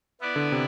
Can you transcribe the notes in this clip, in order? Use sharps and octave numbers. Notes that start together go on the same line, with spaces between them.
B3 E4 B4 D5
D3
C3